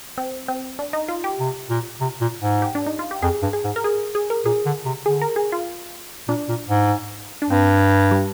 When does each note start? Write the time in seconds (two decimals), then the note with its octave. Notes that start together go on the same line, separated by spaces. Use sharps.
0.18 C4
0.48 C4
0.79 D4
0.93 D#4
1.08 F4
1.24 G4
1.40 C3
1.70 A#2
2.01 C3
2.21 A#2
2.41 G#2
2.62 G4
2.75 D4
2.86 D#4
2.99 F4
3.11 G4
3.22 F2 G#4
3.43 G2
3.53 G#4
3.64 G#2
3.76 A#4
3.84 G#4
4.15 G#4
4.30 A#4
4.45 A#2 G#4
4.66 D3
4.85 C3
5.06 D3 G#4
5.21 A#4
5.36 G#4
5.52 F4
6.28 A#2 D4
6.49 A#2
6.69 G#2
7.42 D4
7.50 G2 C4
8.11 G3